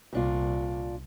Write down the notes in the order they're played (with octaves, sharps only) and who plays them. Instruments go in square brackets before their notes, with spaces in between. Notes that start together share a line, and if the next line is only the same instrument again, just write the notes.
[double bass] C2 [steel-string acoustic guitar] A#2 D4 F4